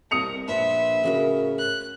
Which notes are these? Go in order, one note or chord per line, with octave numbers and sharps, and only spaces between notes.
C2 A#4 D#6 C#7 F7
A#1 A#2 B4 C5 E5 A5
A2 C#3 F#4 A#4
F#6